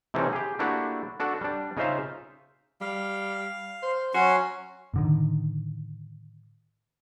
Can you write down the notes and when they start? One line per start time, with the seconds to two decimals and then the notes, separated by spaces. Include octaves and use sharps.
0.14 C3 E3 A3 C4 C#4 D#4
0.33 G4 G#4
0.59 A3 A#3 D4 E4 F#4 G4
1.20 D4 F#4 A4
1.41 G3 D4
1.77 C#3 D#4 F4 C5 E5 F5
2.81 G3 F5
3.82 C5
4.14 F#3 C#4 F#4 C6
4.94 A2 D3 D#3